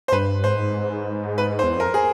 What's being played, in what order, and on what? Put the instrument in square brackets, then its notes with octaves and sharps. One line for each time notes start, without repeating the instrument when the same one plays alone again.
[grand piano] C5
[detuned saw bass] G2 [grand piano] B4
[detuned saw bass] G#2 [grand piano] C5
[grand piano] B4
C5
[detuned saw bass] E2
[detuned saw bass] F2 [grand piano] A#4
[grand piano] G#4